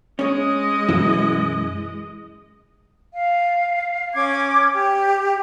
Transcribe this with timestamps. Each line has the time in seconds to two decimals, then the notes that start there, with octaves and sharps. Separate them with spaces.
0.19 G#3 C#4 C#5 D#5
0.89 F#2 B2 E3 E4
3.14 F5
4.14 C#4 D6 G#6
4.73 G4